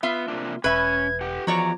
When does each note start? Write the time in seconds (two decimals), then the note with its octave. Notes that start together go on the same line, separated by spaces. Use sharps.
0.03 B3 F4 E5
0.28 C3 A#3 D4
0.64 E1 C#4 B4 E5 G#6
1.21 G4 F#5
1.47 E2 F3 F#4 C#5 D5 A#5